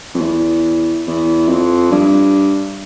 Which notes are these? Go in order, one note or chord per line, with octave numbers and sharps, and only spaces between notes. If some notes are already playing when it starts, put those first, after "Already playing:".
F2
E2
E2
F2
G2